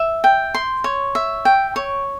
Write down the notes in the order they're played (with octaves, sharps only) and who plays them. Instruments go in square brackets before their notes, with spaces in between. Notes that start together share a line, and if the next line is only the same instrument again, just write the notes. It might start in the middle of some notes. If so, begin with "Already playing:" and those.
Already playing: [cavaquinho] E5
G5
C6
C#5
E5
G5
C#5